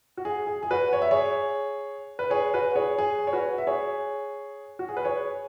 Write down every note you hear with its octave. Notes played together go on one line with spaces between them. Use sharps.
F#4
G#4
G#4
G#4
F#4 B4
C#5
E5
G#4 C#5
B4
G#4 C#5
F#4 B4
G#4 C#5
G#4
C#5
F#4 B4
E5
G#4 C#5
F#4
G#4
B4
G#4 C#5